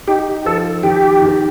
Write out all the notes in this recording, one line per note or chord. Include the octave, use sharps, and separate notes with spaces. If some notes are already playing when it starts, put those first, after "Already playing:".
D#4 G4
F3 A4
D#3 G4
D#3